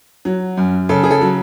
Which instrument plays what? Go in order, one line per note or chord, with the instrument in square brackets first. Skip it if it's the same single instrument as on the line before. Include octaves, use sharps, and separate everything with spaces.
[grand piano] F#3
F#2
C#3 A4
G#4
A4
F#3